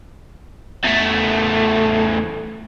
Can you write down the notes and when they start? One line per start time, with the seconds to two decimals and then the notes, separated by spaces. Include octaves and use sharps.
0.84 E2 A3